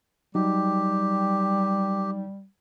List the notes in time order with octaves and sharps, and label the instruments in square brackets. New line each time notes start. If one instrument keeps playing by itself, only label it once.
[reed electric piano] F#3 D#4 [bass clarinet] G3 [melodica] G4